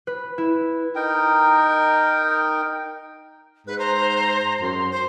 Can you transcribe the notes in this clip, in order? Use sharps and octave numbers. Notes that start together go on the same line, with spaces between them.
B4
E4
D#4 A#4 G5
G#2 B4 F#6
C5 A#5
F#2 C6
C5